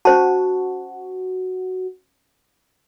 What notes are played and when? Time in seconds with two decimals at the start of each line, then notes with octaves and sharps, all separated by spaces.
0.05 C#4 F#4 C5 A5